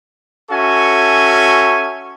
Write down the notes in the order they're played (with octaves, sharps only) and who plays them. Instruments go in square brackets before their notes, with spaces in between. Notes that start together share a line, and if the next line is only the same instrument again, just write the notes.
[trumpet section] C#4 F#4 A4 E5 G#5 C#6